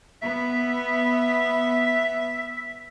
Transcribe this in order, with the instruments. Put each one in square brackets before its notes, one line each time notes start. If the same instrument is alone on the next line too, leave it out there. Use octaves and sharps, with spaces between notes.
[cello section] B3 [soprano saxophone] E5 [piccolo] B6